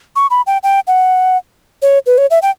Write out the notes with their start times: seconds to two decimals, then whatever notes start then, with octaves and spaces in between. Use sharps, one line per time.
0.16 C#6
0.30 B5
0.47 G5
0.63 G5
0.87 F#5
1.82 C#5
2.06 B4
2.18 C#5
2.31 E5
2.42 G5